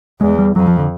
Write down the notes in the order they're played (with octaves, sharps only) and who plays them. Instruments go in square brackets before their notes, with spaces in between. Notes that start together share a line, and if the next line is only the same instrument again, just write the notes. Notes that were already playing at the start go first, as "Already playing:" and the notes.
[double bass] E2 [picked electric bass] G#3
[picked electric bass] G3
[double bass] F2 [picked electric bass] F#3
[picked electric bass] F3
D3